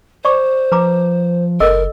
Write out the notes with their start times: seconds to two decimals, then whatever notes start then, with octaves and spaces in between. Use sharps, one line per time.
0.25 C5 D5 C#6 D6
0.72 F3 B4 A#5 D6
1.60 F#1 A4 A#4 D#5 E6